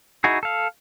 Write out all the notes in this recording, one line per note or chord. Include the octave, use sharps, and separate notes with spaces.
D#4 E4 F#4 G#4
A4 F5